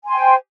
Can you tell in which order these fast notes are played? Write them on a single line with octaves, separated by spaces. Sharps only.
G#5 C6 G5 C5